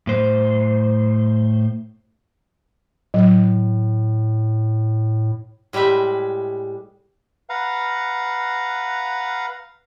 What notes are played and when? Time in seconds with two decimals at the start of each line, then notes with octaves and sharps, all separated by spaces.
0.07 A2 C5
3.14 A2 F#3
5.73 A2 G3 G#3 B4 E5
7.50 B4 F5 F#5 A#5